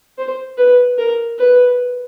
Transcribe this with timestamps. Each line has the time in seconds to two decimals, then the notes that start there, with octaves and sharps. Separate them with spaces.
0.18 C5
0.57 B4
0.98 A#4
1.38 B4